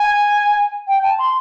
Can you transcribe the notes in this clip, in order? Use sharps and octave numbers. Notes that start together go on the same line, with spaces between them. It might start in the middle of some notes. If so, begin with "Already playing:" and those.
Already playing: G#5
G5
A5
C6